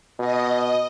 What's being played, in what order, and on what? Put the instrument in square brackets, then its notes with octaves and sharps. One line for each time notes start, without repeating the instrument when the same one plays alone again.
[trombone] B2 [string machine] D#5